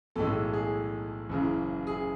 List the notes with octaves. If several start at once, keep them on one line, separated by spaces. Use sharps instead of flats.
B1 A2 E3 G#3 A4
G#4
F#1 F#2 C#3 E3
G#4